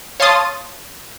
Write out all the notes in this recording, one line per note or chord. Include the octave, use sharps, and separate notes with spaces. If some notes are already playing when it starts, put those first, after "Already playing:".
C#5 F5 A5 C6 D#6 A6